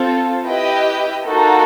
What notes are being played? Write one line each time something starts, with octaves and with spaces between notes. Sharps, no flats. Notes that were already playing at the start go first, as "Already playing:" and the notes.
Already playing: C4 F4 A4
E4 G4 B4 D#5 G5
A#3 D#4 F#4 A4